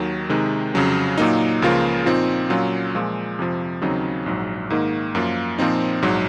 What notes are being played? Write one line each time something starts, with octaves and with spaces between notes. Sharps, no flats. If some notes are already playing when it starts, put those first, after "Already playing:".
Already playing: D#2 D#3 F#3
C3 D#3 G#3 D#4
F2 C#3 F#3 C#4
A#2 F#3 A#3 D#4
C#2 C#3 F3 A#3 F4
A#2 F3 C4 D#4
A#2 F#3 C#4 F4
A#2 F3 G#3
F2 C3 F3
D#2 C#3 F#3 C4 D#4
A#1 G#2 F#3
G#2 D#3 A#3 D#4
F#2 F3 A#3 F4
A#2 F3 C4 D#4
A#1 G#2 F#3